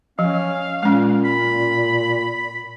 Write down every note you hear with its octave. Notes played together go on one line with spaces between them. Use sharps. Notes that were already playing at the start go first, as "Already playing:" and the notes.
F3 C#4 F5
A#2 G#3 C#4
B5